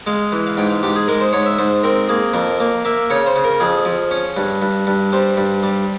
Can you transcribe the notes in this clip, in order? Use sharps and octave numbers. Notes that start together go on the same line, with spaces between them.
G#3 F5
E3
F5
G#2 G5
F5
G#2 G4
G#4
G#3 A#4
C5
G#2 C#5
E5
G#2 C5
C4 A#4
A#3 G#4
F2 A#4
A#3
A#3 E5
C#3 C#5
C5
C#3
A#4
F2 G#4
F3
C#4
G2
G2
G2
G3 C5
G2
G3